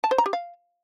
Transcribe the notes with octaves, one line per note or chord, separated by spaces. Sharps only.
A5
C5
A#5
G4
F5